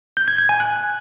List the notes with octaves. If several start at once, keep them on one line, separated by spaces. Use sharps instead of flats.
G6
G#6
G#6
G#5
F#6